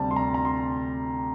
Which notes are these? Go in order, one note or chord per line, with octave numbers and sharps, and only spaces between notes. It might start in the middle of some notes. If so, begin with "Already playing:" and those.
Already playing: D2 C3 G3 A5
C6
A#5
A#5
C6